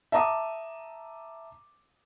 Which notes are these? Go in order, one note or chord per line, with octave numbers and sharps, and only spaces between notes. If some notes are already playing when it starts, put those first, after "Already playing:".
E5 A5 A#5 D6 D#6